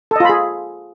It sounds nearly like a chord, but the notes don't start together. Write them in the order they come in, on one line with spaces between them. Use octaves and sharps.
A4 D#5 F4 B5 G#4